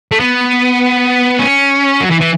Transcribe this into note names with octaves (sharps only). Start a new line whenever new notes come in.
A3
B3
C#4
F#3
E3
E3